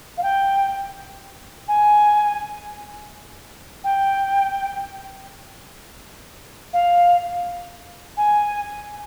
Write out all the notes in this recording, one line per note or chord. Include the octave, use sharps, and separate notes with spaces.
F5
G5
G#5
G5
F5
G#5